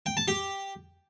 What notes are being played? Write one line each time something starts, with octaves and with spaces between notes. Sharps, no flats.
G5
A5
G4